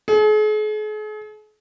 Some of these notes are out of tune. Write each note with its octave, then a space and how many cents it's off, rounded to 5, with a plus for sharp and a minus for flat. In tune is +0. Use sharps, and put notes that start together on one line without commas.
G#4 +45